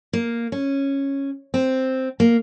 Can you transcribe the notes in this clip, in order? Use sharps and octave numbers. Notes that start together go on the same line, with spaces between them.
A#3
C#4
C4
A#3